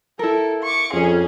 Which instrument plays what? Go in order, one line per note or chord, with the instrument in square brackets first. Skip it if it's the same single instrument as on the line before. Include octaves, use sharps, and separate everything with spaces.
[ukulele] E4 A#4 [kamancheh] A4
[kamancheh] C#6 D6
[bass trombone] F2 [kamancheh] C#4 G#4